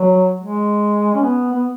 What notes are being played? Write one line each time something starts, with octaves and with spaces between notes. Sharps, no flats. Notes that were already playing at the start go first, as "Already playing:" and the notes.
Already playing: F#3
G#3
C#4
B3
B3